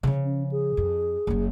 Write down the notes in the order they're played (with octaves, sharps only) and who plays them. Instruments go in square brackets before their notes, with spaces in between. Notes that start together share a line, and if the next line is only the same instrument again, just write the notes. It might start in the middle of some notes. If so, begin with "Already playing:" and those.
[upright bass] C#3 F3
[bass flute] C#4
G#4
[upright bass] F2
F#1 F#2